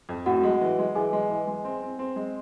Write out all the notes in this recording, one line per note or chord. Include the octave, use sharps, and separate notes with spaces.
F2
A2 F#4 F#5
G#3
E3
G#3
E3 G#4 G#5
G#3
E3
G#3
C4
C4
C4
G#3